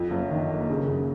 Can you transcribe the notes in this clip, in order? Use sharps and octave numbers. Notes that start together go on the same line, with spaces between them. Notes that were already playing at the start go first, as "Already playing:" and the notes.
Already playing: F2
F#1
D#3
A#3
C#3
F#2